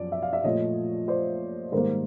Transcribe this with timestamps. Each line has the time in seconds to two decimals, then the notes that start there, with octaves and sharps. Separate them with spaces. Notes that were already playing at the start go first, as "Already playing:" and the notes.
Already playing: F#2 F3 D5
0.12 E5
0.22 F5
0.33 D5 E5
0.44 A#2 F3 A3 C#5 D#5
1.08 C5 D5
1.72 G#2 D#3 G3 A#3 A#4 C5